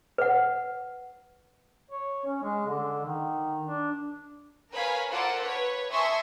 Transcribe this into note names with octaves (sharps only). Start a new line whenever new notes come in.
B4 F#5
C#5
C#4
G#3
D3
D#3
D4
A#4 B4 C#5 F5 G#5 B5
F4 A4 A#4 C5 D5 F#5
B4 C#5
E5 G#5 A5 C6 C#6 D#6